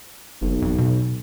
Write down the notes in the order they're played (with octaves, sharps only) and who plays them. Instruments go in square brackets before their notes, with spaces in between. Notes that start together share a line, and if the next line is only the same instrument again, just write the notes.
[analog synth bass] F#1 [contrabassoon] B1
[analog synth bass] F2
B2